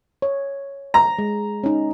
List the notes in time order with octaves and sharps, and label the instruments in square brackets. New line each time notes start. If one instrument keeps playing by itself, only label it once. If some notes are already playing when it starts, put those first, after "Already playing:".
[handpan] C#5
[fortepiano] A#5
[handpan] G#3
C#4 D#4